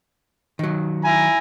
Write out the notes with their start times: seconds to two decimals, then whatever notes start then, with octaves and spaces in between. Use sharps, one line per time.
0.59 D#3 F#3
1.04 E4 G#5 A#5